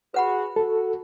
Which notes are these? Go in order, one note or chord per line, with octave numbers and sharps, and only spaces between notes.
F#4 G#4 B4 F#5 B5
F#4 A4